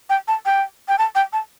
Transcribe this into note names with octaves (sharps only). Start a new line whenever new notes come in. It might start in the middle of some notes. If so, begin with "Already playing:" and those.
G5
A5
G5
G5
A5
G5
A5